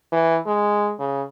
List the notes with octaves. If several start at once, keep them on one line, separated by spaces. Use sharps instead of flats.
E3
G#3
C#3